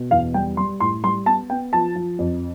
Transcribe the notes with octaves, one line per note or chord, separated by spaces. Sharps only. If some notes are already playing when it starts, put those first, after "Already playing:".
Already playing: B2
E2 F5
G3 G5
G3 C6
A2 C6
G3 C6
B3 A5
B3 G5
F3 A5
F3
F2